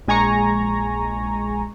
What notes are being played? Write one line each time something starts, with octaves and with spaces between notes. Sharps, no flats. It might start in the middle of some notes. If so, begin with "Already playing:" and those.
A#1 G#3 G#5 A#5 C#6